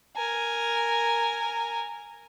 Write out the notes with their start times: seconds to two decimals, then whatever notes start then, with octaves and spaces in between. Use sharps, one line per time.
0.16 A#4 G#5